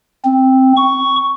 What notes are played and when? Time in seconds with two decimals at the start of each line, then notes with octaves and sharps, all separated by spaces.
0.24 C4
0.77 C#6